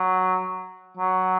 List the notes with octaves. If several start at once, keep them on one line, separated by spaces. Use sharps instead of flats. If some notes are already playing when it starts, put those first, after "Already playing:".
Already playing: F#3
F#3